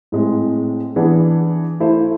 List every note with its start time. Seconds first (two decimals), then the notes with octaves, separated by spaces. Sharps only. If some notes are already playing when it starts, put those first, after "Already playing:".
0.12 A2 G#3 C4
0.96 E3 B3 D4 G#4
1.80 A3 E4 A4 C5